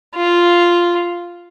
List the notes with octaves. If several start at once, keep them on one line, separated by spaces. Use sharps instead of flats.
F4